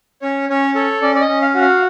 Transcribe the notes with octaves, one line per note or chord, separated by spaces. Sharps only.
C#4 C#5
C#4 C#5
A4 C#5
C#4 D5
D5
D#5
C#4
F5
F#4
F5